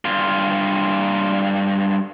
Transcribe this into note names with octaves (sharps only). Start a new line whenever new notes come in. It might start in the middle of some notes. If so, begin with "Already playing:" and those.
G2 F4